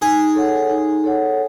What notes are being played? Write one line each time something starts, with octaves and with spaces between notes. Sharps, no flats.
D#4 G#4
A4 C#5 F#5
D#4
A4 C#5 F#5